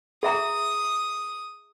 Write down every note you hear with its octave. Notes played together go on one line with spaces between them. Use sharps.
G#4 E5 A#5 D#6